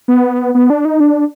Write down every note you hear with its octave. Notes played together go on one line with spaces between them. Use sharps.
B3
B3
D4
D#4
D4